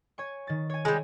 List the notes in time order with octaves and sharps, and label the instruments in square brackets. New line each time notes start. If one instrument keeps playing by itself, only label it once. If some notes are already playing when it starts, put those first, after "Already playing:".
[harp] C#5 G#5 C#6
D#3 A6
C#5 G#5
[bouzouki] G3 G#3